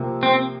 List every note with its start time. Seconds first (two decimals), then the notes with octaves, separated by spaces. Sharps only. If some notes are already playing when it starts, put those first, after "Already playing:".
Already playing: C3 F3 A#3
0.23 C4